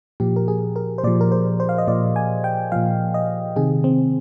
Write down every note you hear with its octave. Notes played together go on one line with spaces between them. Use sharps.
A#2 F3 G4
A#4
G#4
A#4
C5
A#2 F3 D5
A#4
C5
C5
F5
D#5
A#2 F3 D5
G#5
G5
A#2 F3 F5
D#5
C3 D#3 G#4
C4